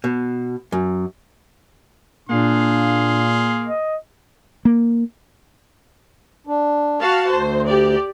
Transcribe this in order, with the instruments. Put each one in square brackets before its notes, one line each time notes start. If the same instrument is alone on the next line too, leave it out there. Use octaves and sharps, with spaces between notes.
[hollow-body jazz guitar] B2
F#2
[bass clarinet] A#2 [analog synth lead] A#3 [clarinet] D4 [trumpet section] G#4 F5 C6
[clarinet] D#5
[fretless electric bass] A#3
[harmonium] D4
[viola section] F#4 F5 A5
[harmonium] D2 [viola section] C5
[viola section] G4 D5